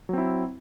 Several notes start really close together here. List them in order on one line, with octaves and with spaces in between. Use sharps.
F#3 C4 E4